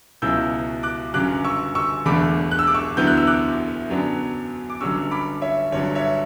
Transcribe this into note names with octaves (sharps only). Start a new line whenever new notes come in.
C#2 B2 F#3 C#4 E4 E6 G6
D6 F#6
G1 F#2 C#3 F#3 D6 F#6
C#6 E6
C#6 E6
E1 E2 D3 A3 B5 D6
F#6
E6
D6
C#6 E6
D2 D3 F#3 B3 E4 G6
F#6
E6
D6 F#6
F#2 D3 F#3 B3 D4
D6
G1 G2 F#3 C#4 C#6 E6
B5 D6
C#5 E5
G1 G2 D3 F#3 C#5
C#5 E5